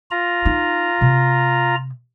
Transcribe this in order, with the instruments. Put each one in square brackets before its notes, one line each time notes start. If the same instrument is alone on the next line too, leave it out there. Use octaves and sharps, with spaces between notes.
[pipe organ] F4 A#5
[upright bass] D#4
C3